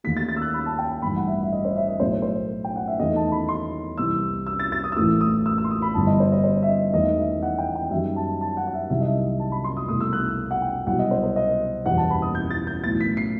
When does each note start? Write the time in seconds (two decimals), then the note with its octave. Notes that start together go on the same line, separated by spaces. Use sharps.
0.04 D#2 D#3 A3 B6
0.17 A6
0.29 A6
0.36 E6
0.42 F#6
0.54 B5
0.66 A5
0.79 G5
1.02 A1 G2 D#3 B5
1.16 F#5
1.28 E5
1.43 E5
1.52 D#5
1.65 C5
1.76 E5
1.88 D#5
2.00 B1 A2 F#3 A3 C5
2.22 C5
2.65 G5
2.76 F#5
2.87 E5
2.99 E2 D#3 A3 D#5
3.16 A5
3.32 B5
3.49 C6
3.98 C2 C3 E3 E6
4.47 E6
4.59 A6
4.72 A6
4.84 D#6
4.92 E6
4.96 A1 A2 E3 A3 D#6
5.21 D#6
5.46 E6
5.58 E6
5.64 C6
5.70 D#6
5.82 B5
5.94 G1 G2 E3 A5
6.07 D#5
6.20 C5
6.32 D#5
6.44 C5
6.62 E5
6.68 D#5
6.93 E1 E2 D#3 A3 D#5
7.18 E5
7.42 F#5
7.59 G5
7.76 G5
7.91 F#2 D#3 G3 E5
8.16 A5
8.41 A5
8.57 F#5
8.67 F#5
8.73 E5
8.90 C2 C3 D#3 F#3 E5
9.01 D#5
9.07 E5
9.39 A5
9.52 B5
9.64 C6
9.77 D#6
9.88 C2 B2 A3 D#6
10.00 E6
10.13 F#6
10.51 F#5
10.62 G5
10.86 C2 B2 F#3 F#5
10.99 D#5
11.11 C5
11.23 C5
11.36 D#5
11.85 F#1 E2 B2 G3 F#5
11.97 A5
12.10 B5
12.22 D#6
12.35 G6
12.50 A6
12.67 G6
12.84 B1 A2 E3 A6
13.01 B6
13.17 C7